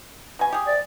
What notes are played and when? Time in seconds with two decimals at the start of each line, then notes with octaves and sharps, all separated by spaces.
0.39 B2 G#5
0.52 G4 G#4
0.67 D5